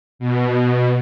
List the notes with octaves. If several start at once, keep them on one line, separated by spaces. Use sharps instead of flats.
B2